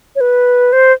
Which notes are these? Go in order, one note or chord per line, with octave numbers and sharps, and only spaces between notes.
C#5
B4
C5